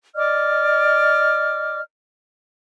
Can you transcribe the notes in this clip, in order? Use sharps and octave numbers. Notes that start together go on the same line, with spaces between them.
D5 D#5 D6 F6